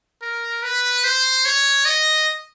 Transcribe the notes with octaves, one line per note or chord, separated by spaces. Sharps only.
A#4
B4
C5
C#5
D#5